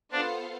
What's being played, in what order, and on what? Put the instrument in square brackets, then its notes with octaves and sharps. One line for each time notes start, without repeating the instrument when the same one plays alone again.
[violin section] B3 F4 A4 C5 F5 [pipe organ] D4